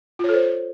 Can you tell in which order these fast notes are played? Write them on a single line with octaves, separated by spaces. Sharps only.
F4 C#5 A4 C5